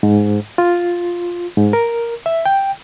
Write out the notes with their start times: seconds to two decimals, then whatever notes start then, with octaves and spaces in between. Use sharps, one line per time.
0.03 G#2
0.58 F4
1.57 G#2
1.73 A#4
2.26 E5
2.46 G5